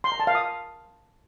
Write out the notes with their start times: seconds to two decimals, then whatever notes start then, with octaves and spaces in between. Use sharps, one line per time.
0.04 C6
0.12 A#5
0.20 A5
0.27 F5
0.35 D#6